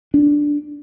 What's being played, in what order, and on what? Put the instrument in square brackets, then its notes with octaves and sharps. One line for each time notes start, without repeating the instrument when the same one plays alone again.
[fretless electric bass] D4